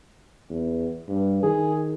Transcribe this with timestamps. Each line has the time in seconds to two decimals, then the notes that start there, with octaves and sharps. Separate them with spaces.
0.50 E2
1.09 G2
1.43 D#3 G#4